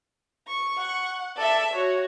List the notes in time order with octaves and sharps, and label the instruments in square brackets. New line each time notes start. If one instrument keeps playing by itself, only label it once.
[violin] C#6
[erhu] F#5
[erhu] A4 [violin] D5 E5
[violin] F#4 [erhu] C#5